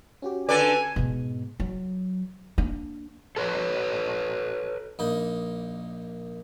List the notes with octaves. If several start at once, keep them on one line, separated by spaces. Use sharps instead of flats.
C#4 F#4 G4
D3 A4 B4 D5 G#5
G#2 B2
F#3
A#3 D4
A4 B4 C#5
A#1 A#3 D#4